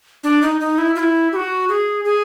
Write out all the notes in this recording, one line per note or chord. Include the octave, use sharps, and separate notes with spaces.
D4
D#4
D#4
E4
F4
E4
G4
F#4
G#4
G#4